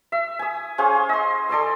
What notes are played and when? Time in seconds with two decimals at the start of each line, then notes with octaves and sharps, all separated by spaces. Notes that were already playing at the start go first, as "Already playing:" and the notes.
0.12 E5
0.39 G#5 D#6
0.78 C#4 G#4 C5 F5
1.09 D#5 C6
1.49 A4 D5 C6 E6